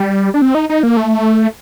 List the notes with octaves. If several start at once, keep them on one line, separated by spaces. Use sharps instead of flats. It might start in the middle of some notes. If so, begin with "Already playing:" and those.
Already playing: G3
D4
C4
D#4
D#4
A#3
A3